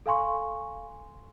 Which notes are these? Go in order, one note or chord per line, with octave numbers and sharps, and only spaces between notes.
A4 F5 G#5 C6 C#6